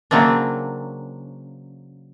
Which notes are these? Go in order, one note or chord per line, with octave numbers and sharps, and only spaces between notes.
C#3 F#3 A#3 C4 D4